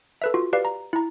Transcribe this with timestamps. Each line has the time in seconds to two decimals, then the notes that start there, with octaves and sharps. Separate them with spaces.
0.22 A4 B4 E5
0.34 F4 F#4
0.53 G4 B4 D5 F5
0.65 A#5
0.93 E4 A#5